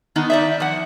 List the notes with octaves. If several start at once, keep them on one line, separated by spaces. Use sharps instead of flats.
D#3 B3 D#4
D#4 D5 E5
F3 F#5